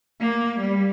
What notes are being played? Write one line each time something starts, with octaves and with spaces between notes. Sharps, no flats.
A#3
G3